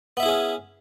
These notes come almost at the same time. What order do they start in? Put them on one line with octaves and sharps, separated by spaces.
B3 E5 E4 G#4 C#4